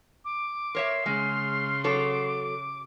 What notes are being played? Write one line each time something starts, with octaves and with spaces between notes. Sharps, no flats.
D6
A#4 C#5 E5 C6
C#3 G#3 F6
F#3 A4 C#5 D6